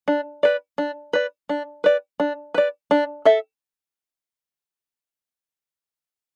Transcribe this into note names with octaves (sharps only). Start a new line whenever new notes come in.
D4
B4 D5
D4
B4 D5
D4
B4 D5
D4
B4 D5
D4
A4 E5